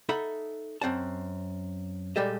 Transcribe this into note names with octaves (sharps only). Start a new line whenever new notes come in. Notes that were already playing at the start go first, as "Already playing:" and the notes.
D#4 A4 E5 F#5 B5
F#2 C4 F#5 A5
A#2 G3 G#3 G4 A4 D#5